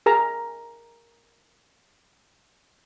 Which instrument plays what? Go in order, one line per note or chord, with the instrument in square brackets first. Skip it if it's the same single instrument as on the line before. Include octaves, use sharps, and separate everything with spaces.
[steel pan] G#4 A#4 A#5